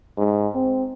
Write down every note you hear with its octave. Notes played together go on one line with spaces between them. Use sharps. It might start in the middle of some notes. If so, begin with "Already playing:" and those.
G#2
C4